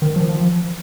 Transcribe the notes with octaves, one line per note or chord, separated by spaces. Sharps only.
D#3
F3
F3